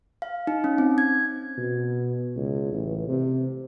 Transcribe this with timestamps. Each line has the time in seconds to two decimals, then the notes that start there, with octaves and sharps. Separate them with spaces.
0.22 F5
0.47 D#4
0.64 C#4
0.78 C4
0.98 G#6
1.57 B2
2.36 C#2
2.72 A1
3.08 C3